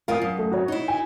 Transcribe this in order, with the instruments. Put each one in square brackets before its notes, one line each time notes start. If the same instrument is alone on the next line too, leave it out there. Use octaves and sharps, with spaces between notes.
[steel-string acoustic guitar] E2 F4 A#4 [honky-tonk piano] F5 D#6
[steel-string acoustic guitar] F#2
[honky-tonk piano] A3
F#4 C#5
[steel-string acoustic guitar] D#4 E4
[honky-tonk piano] G#5